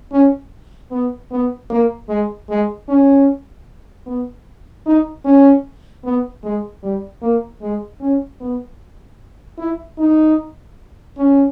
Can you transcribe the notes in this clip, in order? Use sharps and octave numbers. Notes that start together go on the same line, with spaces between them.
C#4
B3
B3
A#3
G#3
G#3
C#4
B3
D#4
C#4
B3
G#3
G3
A#3
G#3
C#4
B3
E4
D#4
C#4